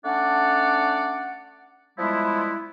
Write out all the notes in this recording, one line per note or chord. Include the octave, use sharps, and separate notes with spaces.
A3 C#4 D4 D5 F#5
F3 G3 G#3 B3 E4